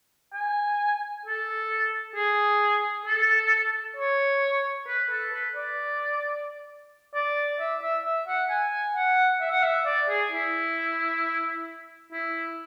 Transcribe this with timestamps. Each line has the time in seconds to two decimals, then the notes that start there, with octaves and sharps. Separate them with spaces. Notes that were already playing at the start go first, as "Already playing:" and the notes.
0.34 G#5
1.25 A4
2.15 G#4
3.06 A4
3.96 C#5
4.88 B4
5.10 A4
5.33 B4
5.56 D5
7.14 D5
7.60 E5
7.82 E5
8.05 E5
8.27 F#5
8.49 G#5
8.96 F#5
9.41 E5
9.51 F#5
9.63 E5
9.86 D5
10.09 G#4
10.31 E4
12.12 E4